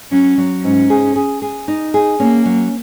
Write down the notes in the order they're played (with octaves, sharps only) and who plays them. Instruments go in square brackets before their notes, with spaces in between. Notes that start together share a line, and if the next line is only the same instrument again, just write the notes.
[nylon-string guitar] F#3 [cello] C#4
[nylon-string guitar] F#3
[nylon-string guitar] G#2 [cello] C#4
[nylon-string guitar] G#4
G#4
G#4
D#4
G#4
[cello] A#3 [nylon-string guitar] C#4
[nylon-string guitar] F#3